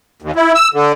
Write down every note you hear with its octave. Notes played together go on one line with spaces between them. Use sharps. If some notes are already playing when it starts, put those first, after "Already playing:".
D#2
E4
E6
D3